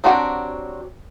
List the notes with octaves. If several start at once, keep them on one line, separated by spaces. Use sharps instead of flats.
F#3 C4 D4 F#4 G4